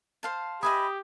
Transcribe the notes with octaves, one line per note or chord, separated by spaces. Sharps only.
C5 F5 A5
G4 D#5 E5 G#5 B5 D#6